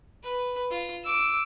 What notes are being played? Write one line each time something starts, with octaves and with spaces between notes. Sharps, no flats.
B4
F4
D6 E6